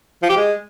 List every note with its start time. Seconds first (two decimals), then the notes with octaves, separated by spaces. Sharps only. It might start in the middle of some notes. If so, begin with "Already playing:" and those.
0.23 F3
0.30 G4
0.36 G#3